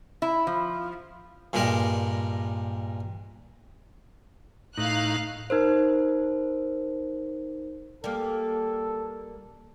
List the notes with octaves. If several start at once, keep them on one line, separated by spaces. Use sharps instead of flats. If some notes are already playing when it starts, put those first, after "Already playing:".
E4
F3
G2 A#2 G3 G#3 A#4
A2 D#4 F5 F#6
D#4 A#4 C5
G3 A#3 A4